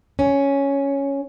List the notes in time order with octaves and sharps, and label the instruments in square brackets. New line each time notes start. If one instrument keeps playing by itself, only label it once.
[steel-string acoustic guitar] C#4